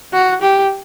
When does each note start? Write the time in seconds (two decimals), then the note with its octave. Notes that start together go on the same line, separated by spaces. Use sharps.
0.13 F#4
0.41 G4